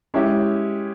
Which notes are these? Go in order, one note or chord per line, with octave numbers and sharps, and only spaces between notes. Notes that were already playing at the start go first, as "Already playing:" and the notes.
G#3 C#4 E4 G4